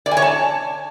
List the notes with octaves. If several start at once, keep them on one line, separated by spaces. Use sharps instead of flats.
D5
G#5
C#5
A5